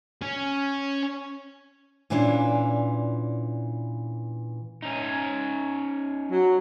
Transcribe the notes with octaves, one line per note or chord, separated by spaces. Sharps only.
C#4
A#2 E3 C#4 D4 F4
C#4 D#4
F#3